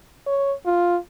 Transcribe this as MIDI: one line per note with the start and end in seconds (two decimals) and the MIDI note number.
0.27 0.53 73
0.66 0.97 65